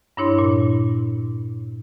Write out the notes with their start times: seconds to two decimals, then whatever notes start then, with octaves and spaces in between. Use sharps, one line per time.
0.17 G2 D4 E4 C#5 C6
0.39 A#2